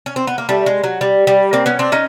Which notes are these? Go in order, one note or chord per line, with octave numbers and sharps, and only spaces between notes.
C#4
C4
B3
A#3
G3 A3
G#3
F#3
G3
G3
A#3 C4
B3 C#4
C4 D4
C#4 D#4